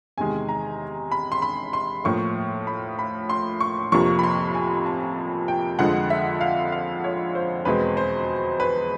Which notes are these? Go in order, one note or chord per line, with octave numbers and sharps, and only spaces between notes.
E2 C3 D#3 G#3 G#5
A#5
B5
C6
B5
C6
A2 F3 A#3 C#6
B5
B5
C6
C#6
F2 C3 F3 A#3 C#6
B5
C6
G#5
A5
G5
F2 D3 F3 G#3 F#5
E5
F5
F5
C#5
C5
E2 B2 G#3 C4 B4
C5
B4